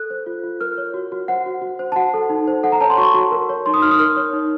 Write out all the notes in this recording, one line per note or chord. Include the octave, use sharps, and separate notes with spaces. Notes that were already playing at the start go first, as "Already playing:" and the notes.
Already playing: A4 F#6
C5
F4
F4
A#4 F6
C#5
F#4
F#4
C5 F#5
F#4
F#4
C5
A5
F#4 F#5
A4
D#4
C5
A4 F#5
A#5
C#5 A5
C6
F#4 C#6
F#4
A#4
C#5
D#4 C6
D#6
D#4 F6
D#6
A#4 F6
C#5
D#4